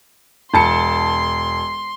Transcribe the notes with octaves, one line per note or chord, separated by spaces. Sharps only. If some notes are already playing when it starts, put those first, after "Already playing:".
E1 A5 C6 C#7